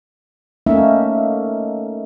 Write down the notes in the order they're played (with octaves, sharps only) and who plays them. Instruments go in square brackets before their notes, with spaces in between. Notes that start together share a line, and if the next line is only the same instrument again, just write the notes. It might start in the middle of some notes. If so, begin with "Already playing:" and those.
[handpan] A3 A#3 C#4 D#4 E5